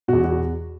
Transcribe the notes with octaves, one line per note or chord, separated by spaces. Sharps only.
E2 B2 F#4
F#4